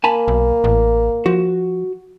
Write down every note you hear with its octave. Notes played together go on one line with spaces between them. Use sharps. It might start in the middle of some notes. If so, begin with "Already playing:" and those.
A#3 G#5 A5 B5
B1
A1
F3 F#4